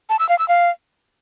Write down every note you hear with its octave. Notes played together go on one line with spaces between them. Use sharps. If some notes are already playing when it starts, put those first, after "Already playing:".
A5
E6
F5
E6
F5